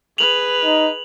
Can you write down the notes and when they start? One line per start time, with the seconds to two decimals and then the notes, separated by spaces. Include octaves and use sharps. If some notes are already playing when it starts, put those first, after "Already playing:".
0.18 G#4 B4 F7 F#7
0.64 D#4